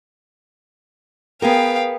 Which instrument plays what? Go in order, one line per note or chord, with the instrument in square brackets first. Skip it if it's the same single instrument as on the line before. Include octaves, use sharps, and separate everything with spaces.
[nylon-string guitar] B3 G#4 A#4 [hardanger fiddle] F5 G5